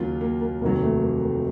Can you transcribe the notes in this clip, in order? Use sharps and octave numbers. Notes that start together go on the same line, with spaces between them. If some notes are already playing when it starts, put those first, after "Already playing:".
Already playing: D#2 C#3 F#3 F4
A#3
A#3
F1 D#2 D#3 F#3 A#3
A3
A#3
A#3